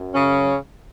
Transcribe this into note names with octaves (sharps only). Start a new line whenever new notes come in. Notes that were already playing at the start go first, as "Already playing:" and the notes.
Already playing: F#2 F#3
C#3 C#4